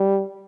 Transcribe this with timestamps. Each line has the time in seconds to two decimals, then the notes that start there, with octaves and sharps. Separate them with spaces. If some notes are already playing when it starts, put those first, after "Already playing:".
Already playing: G3